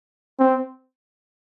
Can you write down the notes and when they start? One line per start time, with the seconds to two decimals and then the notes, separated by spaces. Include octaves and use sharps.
0.39 C4